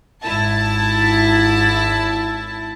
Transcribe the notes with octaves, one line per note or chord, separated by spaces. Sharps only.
G#1 E4 A5